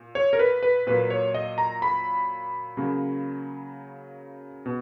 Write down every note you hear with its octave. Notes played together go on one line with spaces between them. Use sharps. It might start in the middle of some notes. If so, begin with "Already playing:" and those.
Already playing: A#2
C#5
A#4
B4
B4
A#2 F#3 A#3 B4
C#5
D#5
A#5
B5
C#3 F#3 A#3
B2